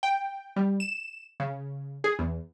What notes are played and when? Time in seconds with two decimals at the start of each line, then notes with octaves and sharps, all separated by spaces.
0.03 G5
0.56 G3
0.80 E7
1.40 C#3
2.04 G#4
2.19 E2